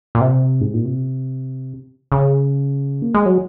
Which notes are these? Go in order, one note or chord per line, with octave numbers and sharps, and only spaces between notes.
A#2
C3
G#2
A#2
C3
C#3
A#3
G#3
F#3